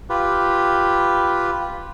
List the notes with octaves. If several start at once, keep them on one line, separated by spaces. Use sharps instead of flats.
F4 G4 B4